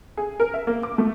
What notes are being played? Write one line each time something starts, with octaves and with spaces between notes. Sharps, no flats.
G#4
A#4
E5
A#3
D6
A3